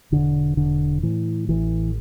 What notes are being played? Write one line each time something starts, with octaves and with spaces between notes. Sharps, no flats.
E1 D3
E1 D3
A2 E3
A1 E3